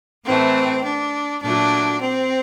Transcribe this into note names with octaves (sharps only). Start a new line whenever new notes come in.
A2 E3 A3 C4
D4
A#2 F#3 A3 D4
C4